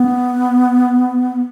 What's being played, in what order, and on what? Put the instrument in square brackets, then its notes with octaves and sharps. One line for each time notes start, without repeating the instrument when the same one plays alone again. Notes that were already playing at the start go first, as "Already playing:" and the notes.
Already playing: [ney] B3